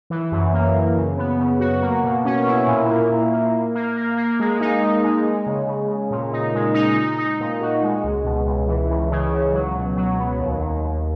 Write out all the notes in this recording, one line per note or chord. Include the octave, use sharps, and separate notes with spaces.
E3
F#2
A#3
F#2
C#3
B3
C#3
F#4
A#3
B2
C#4
E4
A#2
A#3
A#2
A#3
A#3
A#3
A#3
A#3
G#3
D#4
D#4
G#3
G#3
C#3
C#3
C#3
A#2
D#4
G#3
D#4
D#4
D#4
A#2
F#4
G#3
C#2
B2
C#2
E3
C#2
C#3
C#2
F#3
B2
F#3
B3
D#2
D#2
D#2